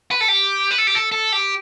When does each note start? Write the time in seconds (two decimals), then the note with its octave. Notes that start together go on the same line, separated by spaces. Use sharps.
0.11 B4
0.21 A4
0.28 G4
0.71 B4
0.78 A4
0.87 G4
0.95 A4
1.12 A4
1.32 G4